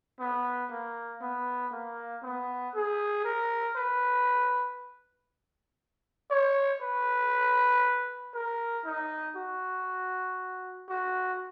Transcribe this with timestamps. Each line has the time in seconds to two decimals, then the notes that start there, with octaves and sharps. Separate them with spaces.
0.19 B3
0.70 A#3
1.21 B3
1.72 A#3
2.23 B3
2.74 G#4
3.24 A#4
3.76 B4
6.30 C#5
6.81 B4
8.34 A#4
8.85 D#4
9.36 F#4
10.89 F#4